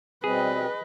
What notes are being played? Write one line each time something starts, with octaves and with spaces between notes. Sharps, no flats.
B2 G3 C4 G#4 B4 D#5